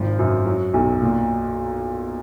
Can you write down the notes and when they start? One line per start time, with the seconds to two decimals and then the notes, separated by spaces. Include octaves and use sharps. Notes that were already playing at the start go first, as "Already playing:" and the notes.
Already playing: G#1 F3
0.19 F#2
0.46 F#3
0.74 B1
1.01 A#2